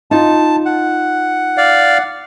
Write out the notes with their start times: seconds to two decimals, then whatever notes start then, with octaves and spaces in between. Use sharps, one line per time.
0.11 D#4 F4 A5
0.66 F#5
1.57 D5 F5